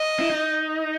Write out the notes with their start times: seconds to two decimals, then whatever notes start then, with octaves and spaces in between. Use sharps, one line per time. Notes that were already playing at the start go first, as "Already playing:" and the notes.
Already playing: D#5
0.20 E4
0.30 D#4